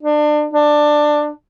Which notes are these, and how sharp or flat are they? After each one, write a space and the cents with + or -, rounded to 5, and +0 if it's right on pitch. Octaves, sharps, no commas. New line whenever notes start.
D4 +30
D4 +15